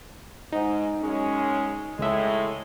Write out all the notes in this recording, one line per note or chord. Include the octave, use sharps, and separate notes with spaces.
G#2 D#4
F#2 G#3 C#4
C#2 A2 G#3 E5